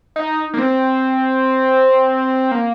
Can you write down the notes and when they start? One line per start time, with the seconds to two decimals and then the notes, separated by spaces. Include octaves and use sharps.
0.16 D#4
0.54 A#3
0.58 C4
2.51 A#3